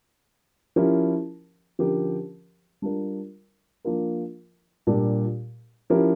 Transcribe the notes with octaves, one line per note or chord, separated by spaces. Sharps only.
F3 C#4 E4 G4 A#4
D3 F3 C#4 G4 A#4
G3 D4 F4 A#4
F3 A#3 D4 F4 A#4
A#2 G3 D4 G4 A#4
F3 C#4 E4 G4 A#4